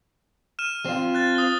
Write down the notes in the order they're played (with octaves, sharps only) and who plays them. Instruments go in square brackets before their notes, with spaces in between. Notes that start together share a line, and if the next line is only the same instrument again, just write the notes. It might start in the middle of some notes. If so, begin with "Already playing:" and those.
[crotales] F6 D#7 E7
[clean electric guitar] C4 F4
[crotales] F#6 A6
D#6 G7